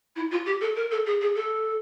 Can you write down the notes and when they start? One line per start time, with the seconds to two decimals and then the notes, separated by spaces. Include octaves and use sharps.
0.16 E4
0.31 F4
0.46 G4
0.61 A4
0.76 A#4
0.91 A4
1.06 G#4
1.21 G#4
1.35 A4